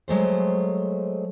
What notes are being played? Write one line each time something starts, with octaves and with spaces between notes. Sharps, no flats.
F#3 G#3 A3 C5